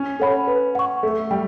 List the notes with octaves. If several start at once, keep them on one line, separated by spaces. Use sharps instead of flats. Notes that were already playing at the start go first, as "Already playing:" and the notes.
Already playing: C#4
A4 C#5 F#5 B5
B4
F#5 C#6
A3 A4
G3 G5